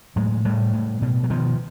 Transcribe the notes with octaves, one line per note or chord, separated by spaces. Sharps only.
A2 F#3 G#3
A2 G3 A3
A2
B2
F#3
B2 D#3 F3